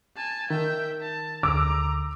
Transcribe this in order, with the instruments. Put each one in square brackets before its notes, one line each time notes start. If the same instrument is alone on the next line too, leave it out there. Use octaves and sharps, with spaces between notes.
[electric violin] G#5 A5
[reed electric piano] D#3 [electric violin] E5 G5
[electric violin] A5
[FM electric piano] D2 D3 [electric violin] A#5 [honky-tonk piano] D6 E6